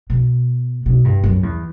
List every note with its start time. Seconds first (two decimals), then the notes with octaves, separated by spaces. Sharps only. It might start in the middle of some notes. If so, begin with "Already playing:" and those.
0.10 B2
0.86 B2
1.04 G2
1.24 F#2
1.43 E2